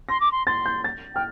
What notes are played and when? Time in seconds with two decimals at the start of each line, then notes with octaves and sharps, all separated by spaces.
0.09 C6 A#6
0.20 D6
0.32 C6
0.47 C6 A6
0.66 G6
0.84 A6
1.14 G5 F6